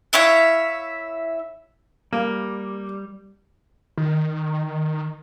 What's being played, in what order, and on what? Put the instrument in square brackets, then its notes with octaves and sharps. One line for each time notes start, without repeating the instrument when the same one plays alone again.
[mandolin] E4 C#5 E5 F5
[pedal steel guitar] G3 [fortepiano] A#3
[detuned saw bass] D#3